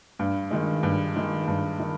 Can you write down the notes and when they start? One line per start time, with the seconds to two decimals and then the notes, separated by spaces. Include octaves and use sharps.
0.19 G2
0.51 D#3 G#3
0.83 G2
1.16 D#3 G#3
1.48 G2
1.80 D#3